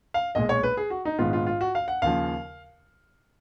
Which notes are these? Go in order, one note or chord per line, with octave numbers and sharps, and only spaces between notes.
F5
B1 A#2 G#3 D#5
C#5
B4
G#4
F#4
D#4
A#1 G#2 D#3 G#3 B3 F4
F4
F4
F#4
F5
F#5
D#2 C#3 F3 F5